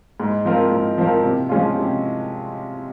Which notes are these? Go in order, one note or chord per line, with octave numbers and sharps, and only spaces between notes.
G#2
F3 C4 F4 A#4
G#2
F3 C4 F4 A#4
C3
F3 G#3 C#4 F4
C3